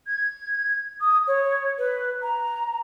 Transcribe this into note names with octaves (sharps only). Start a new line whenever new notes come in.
G#6
D#6
C#5
B4
A#5